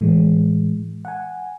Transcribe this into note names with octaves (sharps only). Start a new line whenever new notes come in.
A2 E3 G#3
F#5 G#5